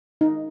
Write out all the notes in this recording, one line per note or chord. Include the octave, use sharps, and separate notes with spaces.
D#4